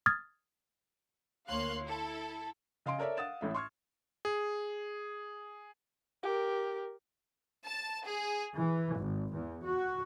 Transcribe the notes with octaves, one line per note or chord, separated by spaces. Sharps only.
D#6 F6 G#6 A6
D2 A#3 C#5 F5 C6 F#6
E4 A4
C#3 D#5 F5 G#5 C6 D7
A4 A#4 C#5 D5 E5
F5 F#5 D#6 A6 E7
A1 A2 E5
C6 C#6 F6 G#6
G#4
G4 A#4
A5
G#4
E3
G#1
E2
F#4